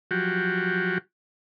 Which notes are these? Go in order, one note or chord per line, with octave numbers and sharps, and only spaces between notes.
F3 F#3 F#4 G4